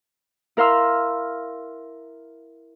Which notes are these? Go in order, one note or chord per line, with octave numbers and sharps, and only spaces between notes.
E4 A#4 F5 C6 E6